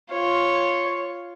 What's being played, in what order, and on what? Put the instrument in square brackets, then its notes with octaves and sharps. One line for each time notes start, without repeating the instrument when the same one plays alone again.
[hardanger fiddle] F4 C#5